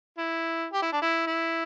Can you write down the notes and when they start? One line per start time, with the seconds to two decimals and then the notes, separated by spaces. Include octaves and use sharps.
0.18 E4
0.73 G4
0.82 E4
0.93 D4
1.02 E4
1.27 E4